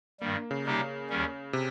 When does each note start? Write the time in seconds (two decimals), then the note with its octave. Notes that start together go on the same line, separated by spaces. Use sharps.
0.20 G2 D#3 G3 A#3
0.35 A#3
0.51 C#3
0.65 C3 G3 A#3 D#4 G4
1.09 D#2 D#3 G3 C#4
1.53 C3